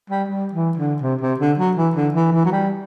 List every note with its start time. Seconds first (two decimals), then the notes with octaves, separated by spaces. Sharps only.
0.10 G3
0.28 G3
0.53 E3
0.77 D3
1.02 C3
1.21 C3
1.39 D3
1.58 F#3
1.77 E3
1.95 D3
2.14 E3
2.32 E3
2.45 F#3
2.51 G3